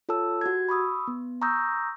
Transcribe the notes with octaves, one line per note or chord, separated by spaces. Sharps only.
F4 A4 C#5 A5 E6
F#4 G4 G#6
B5 C#6 D#6 E6
B3
A#5 C#6 D#6 E6 G6 A#6